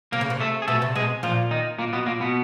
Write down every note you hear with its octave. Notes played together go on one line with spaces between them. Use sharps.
C3 A#3 A#4
C#3
C3
A3 A4
G#4
B2 A3 A4
C3
B2 G#3 G#4
A#2 F3 F4
D#3 D#4
A#2 A#3
B2 B3
A#2 A#3
B2 B3